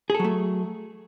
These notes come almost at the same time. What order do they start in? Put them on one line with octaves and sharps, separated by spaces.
G#4 A4 F#3 A3